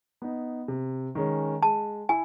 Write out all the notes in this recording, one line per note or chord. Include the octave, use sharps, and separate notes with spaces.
B3 D#4
C3
D#3 G#3 C#4
G#3 A5
E4 G#5